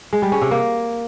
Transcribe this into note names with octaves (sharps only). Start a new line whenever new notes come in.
G#3
G3
C#4
C3
A#3